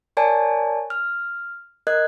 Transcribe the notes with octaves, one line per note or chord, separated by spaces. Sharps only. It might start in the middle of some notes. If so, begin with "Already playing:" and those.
A#4 C#5 D5 G#5 A5
F6
A#4 D#5 F#6 G#6